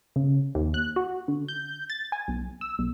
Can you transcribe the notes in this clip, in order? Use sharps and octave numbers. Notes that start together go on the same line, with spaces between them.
C#3
D#2
F#6
F#4
D3
G6
A6
G#5
B1
E6
B1